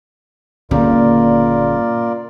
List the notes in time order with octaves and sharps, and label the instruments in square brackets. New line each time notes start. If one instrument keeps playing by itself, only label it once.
[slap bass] G1 G3 [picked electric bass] A#2 C#3 [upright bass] A#3 [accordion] F4 A#4 D5